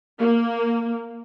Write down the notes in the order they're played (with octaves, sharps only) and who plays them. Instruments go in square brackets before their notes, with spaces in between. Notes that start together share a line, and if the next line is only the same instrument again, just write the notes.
[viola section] A#3